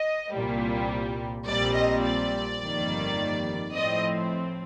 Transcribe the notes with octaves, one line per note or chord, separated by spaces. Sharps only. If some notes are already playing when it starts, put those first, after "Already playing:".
Already playing: D#5
C2 A#2 G3
A#1 A#2 G3 C4 D5
D#5
D5
G1 F2 D#3 G3 A#3
A2 F3 C4 D#5